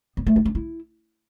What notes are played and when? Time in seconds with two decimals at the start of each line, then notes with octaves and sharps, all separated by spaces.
0.17 B3
0.27 A3
0.36 D#4
0.45 C#4
0.55 E4